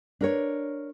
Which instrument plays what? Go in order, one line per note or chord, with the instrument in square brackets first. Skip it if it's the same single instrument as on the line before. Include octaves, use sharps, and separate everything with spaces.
[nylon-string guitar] D4 A#4 C#5